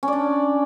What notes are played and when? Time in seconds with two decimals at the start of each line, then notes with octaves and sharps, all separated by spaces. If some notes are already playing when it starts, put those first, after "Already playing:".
0.03 C#4
0.08 D5
0.13 D4